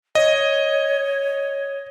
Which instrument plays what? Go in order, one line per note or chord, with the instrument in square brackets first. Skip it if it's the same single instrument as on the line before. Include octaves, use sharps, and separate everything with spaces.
[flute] C#5 [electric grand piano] D#5